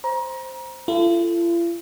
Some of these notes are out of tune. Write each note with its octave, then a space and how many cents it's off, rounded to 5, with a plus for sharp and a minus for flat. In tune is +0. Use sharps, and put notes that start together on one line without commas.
C5 +0 A#5 +30
F4 -45 A4 +0